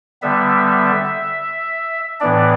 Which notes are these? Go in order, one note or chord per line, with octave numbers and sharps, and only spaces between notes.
D3 G3 B3 E5
A2 E3 B3 D4 D5